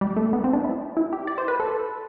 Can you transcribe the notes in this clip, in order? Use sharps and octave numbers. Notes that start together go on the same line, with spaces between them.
G3
A3
B3
C4
D4
E4
E4
G4
D5
C5
B4
A4